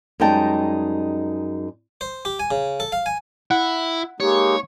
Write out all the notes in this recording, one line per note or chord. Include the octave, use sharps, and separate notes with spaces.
F#2 G3 G#3 D#4 G5 A5
C5
G4
G#5
C#3
A4
F5
G#5
E4 F#5
G#3 A#3 D#4 G4 C#5